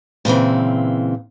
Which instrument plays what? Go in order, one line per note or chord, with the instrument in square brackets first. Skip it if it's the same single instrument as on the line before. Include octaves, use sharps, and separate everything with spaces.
[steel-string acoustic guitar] A#2 C#3 E3 C4